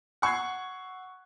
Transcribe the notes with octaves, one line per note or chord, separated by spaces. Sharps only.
F#5 C#6 E6 F#6 G#6 C7